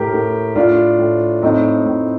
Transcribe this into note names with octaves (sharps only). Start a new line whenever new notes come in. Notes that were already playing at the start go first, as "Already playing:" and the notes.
Already playing: A2 G4 A#4
A2
A2 D4 F4
A2
A2 C4 D#4
A2